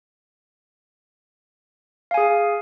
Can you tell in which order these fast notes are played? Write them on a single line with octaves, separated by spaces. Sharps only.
F5 G#5 G#4